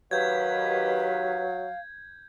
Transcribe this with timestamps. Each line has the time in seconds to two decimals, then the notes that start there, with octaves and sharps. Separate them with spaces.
0.11 D#3 F#3 G4 B4 F5 G6 G#6